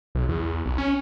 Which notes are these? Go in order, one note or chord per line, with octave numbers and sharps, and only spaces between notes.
B1
E2
B1
C#4